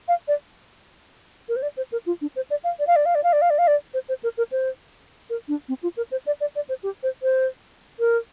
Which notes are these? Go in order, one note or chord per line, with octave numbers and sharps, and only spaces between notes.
F5
D5
A#4
C5
D5
C5
A#4
F4
D4
C5
D5
F5
D5
F5
D5
F5
D5
F5
D5
F5
D5
F5
D5
C5
C5
A#4
A#4
C5
A#4
D4
C4
F4
A#4
C5
D5
D5
D5
C5
G4
C5
C5
A#4